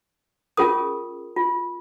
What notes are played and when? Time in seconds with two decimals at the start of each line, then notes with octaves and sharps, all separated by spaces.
0.57 C#4 F4 G#4 A#4 D#6
1.36 F4